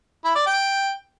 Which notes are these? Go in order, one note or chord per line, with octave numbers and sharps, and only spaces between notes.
E4
D5
G5